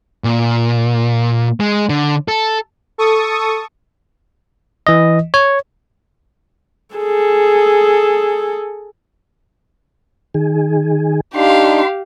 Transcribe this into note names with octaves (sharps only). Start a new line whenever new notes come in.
A#2
G#3
D3
A4
A4 C#6 D#6
E3 D#5
C#5
G#4 A4
D#3 G#4
D4 D#4 G4 F5 C6